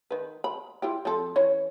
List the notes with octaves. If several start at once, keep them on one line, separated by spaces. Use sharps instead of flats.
D#3 B4
B5
E4 F4 G4
F3 C4 A4
E3 C#4 C#5